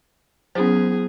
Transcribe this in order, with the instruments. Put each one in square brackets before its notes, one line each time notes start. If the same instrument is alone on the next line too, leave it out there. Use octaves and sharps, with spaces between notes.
[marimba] F#3 B3 [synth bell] C#4 E4 C5 [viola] G#4